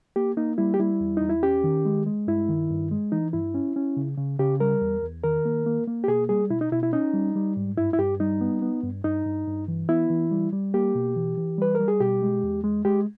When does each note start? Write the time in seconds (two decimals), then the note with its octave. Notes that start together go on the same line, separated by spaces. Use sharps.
0.16 A#3 G4
0.37 A#3 D#4
0.58 G3 E4
0.74 G4
0.80 G3 E4
1.01 E2
1.17 E2 D#4
1.29 E4
1.43 C#4 G4
1.64 D#3
1.85 G#3
2.06 G#3
2.27 G2 E4
2.49 D#3
2.70 G2
2.91 G#3
3.12 E3 D#4
3.33 G2 E4
3.54 C#4
3.76 C#4
3.97 C#3
4.18 C#3
4.39 C#3 G4
4.60 G3 A#4
4.82 E2
5.02 E2
5.23 D#3 A#4
5.45 A#3
5.66 A#3
5.87 A#3
6.04 G4
6.08 B2 G#4
6.29 G3 G#4
6.50 B2 E4
6.61 D#4
6.72 B2 E4
6.83 E4
6.93 C#4 D#4
7.14 G3
7.35 G3
7.57 G#2
7.77 G2 E4
7.93 E4
7.98 G2 G4
8.20 G3 D#4
8.41 B3
8.62 B3
8.83 G2
9.04 G2 D#4
9.26 G2
9.47 G2
9.68 E3
9.89 B3 E4
10.10 E3
10.31 G3
10.53 G3
10.74 A#3 G4
10.95 B2
11.16 E3
11.37 E3
11.58 G3 B4
11.75 G3 A#4
11.88 G#4
12.00 B2 G4
12.22 G#3
12.43 E2
12.64 G#3
12.85 G#3 G4